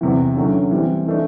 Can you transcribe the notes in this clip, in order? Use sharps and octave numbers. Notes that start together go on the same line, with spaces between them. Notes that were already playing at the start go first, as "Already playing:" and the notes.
E2 C3 E3
D3 F#3 A3 C#4
E3 G3 C4
E3 A3 D4